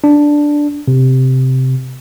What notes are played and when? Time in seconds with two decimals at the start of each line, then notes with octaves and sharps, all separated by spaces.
0.04 D4
0.88 C3